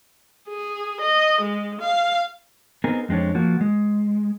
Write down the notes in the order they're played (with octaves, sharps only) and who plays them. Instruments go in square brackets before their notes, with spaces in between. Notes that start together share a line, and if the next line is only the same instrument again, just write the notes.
[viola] G#4
D#5
G#3
F5
[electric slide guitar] B3 C4 D#4 G#4 A#4
F2 G#3 C4 D4 C#5
F3 A#3 F#4
G#3